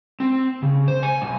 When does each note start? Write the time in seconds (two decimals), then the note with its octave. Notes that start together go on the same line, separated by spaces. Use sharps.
0.20 C4
0.62 C#3
0.88 C5
1.03 G#5
1.22 B1